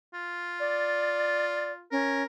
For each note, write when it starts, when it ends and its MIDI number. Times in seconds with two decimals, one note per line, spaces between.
0.14 1.85 65
0.60 1.72 74
1.91 2.23 61
1.91 2.25 70